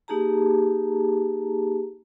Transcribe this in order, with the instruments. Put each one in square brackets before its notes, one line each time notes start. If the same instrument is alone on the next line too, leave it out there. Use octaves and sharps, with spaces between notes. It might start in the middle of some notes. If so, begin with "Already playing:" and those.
[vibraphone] A#3 D#4 G4 G#4 A5 A#5